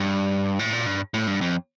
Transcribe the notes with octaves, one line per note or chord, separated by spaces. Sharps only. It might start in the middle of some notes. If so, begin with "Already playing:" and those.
Already playing: G2
A2
A#2
G2
A2
G2
F2